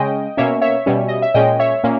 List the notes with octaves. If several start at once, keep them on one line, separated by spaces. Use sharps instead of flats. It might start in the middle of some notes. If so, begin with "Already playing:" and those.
Already playing: C#3 G#3 C#4 D#5 G5
B2 A#3 C#4 C#5 E5
C#5 E5
B2 G3 C#4
D#5
E5
A#2 G#3 C#4 D#5 G5
C#5 E5
A#2 A#3 C#4